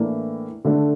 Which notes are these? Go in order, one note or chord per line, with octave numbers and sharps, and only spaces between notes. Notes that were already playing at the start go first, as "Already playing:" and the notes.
Already playing: A2 E3 A#3 D4
D3 A3 D4